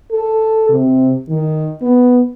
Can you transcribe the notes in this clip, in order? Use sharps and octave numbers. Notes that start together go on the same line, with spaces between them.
A4
C3
D#3
B3